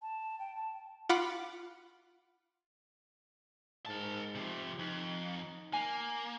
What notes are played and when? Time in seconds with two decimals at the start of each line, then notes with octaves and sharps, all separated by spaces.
0.02 A5
0.39 G5
0.56 A5
1.09 F4 F#5 B5 D6
3.86 G#2 A#4 A5
4.35 C3 F3
4.79 F2 D#4
5.73 A#3 G#5